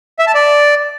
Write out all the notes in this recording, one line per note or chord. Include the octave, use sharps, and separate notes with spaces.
E5
A5
D5